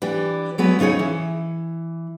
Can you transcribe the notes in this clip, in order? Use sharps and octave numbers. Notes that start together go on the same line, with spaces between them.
E3 D4 G4
F#3 G#3 B3 B4
D#2 C#3 D#4 G#4 C#5
E3